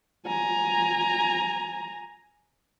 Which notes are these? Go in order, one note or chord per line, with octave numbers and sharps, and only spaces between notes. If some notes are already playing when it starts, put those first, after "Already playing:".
G#5 A#5